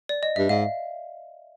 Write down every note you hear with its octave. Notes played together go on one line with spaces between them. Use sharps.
D5
D#5
G2 E5
G#2 F5